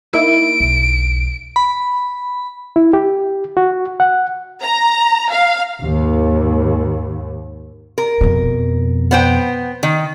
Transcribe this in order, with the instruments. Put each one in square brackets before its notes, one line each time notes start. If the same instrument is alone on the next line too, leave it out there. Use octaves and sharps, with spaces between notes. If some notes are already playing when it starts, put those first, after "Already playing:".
[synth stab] A#3 D#4 E4 [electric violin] D7
[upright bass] B1 E2
[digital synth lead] B5
[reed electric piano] E4
G4
F#4
F#5
[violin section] A#5
F5
[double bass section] D#2 G#2
[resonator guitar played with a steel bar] A#4
[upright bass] F2 B2
[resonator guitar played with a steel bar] B3 C5 G5
D#3